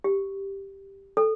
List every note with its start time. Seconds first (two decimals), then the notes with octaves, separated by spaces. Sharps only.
0.04 G4
1.17 A4